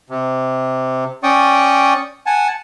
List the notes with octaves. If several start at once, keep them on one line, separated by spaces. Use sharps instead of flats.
C3
C#4 D5 G5 C#6 D#6
F#5 G#5 A5